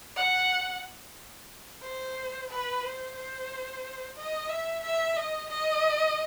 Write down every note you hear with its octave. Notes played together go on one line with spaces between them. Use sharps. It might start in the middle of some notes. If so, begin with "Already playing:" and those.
F#5
C5
B4
C5
C5
D#5
E5
E5
D#5
D#5